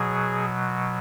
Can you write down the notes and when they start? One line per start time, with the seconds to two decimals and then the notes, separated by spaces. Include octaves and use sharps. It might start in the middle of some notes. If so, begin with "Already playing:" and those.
Already playing: B2 F#3 G#4